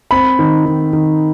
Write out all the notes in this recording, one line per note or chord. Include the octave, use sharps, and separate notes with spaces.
C4 B5
D#3
D#3
D#3